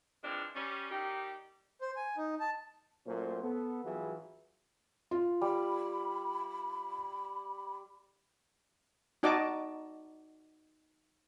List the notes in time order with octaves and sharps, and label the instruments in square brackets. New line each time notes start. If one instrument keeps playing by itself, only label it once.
[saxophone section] E3 F3 G#3 C4 D4
G3 C#4
D#3 G3 D#4 G4
[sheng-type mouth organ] C5
G#5
D#4
A5
[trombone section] A#2 F#3 A3 C#4 C5
B3 A4
G#1 E3 F#3 G3 F4 G#4
[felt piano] F4
[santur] G3 [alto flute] B5
[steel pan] D#4 F#4 D5 D#5 A5 D6